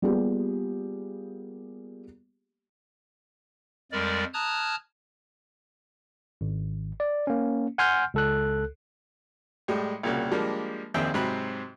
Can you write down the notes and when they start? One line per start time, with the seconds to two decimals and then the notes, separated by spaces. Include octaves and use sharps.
0.02 G3 A#3 B3 F4 G4 G#4
3.92 F2 G3 G#3 A#4 D5
4.34 A5 A#5 D#6 F6 F#6 G#6
6.41 G#1
7.00 D5
7.27 A#3 C#4
7.78 F#5 G#5 C6 F6 G6
8.14 C#2 A4 F#6
9.68 A2 G3 G#3
10.03 C2 A#2 C#3 F#4
10.32 F3 G3 G#3 A#3 D4
10.94 A#1 D#2 C4 G#4 E5 G5
11.14 G#2 C3 F#3 C4 B5 F#6